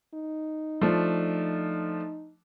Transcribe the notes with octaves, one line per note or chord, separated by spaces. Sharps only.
D#4
F3 A3 D4